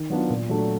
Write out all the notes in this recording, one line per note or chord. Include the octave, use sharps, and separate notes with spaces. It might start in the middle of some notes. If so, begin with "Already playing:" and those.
Already playing: D#3
F#3 B3 D4 F4
A#2
F#3 A3 D4 F#4